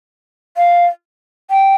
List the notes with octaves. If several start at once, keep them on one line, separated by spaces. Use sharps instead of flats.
F5
G5